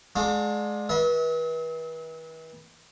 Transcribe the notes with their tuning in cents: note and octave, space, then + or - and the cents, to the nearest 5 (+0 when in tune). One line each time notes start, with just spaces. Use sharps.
G#3 +25 D4 +25 F#4 -45
E3 -35 E5 -45